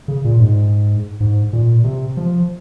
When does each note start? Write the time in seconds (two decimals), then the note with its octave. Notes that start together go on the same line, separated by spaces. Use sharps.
0.08 C#3
0.25 A#2
0.40 G#2
1.20 G#2
1.53 A#2
1.84 C3
2.17 F3